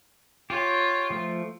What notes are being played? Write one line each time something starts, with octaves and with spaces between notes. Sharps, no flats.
F4 G4 C#5
F3 A3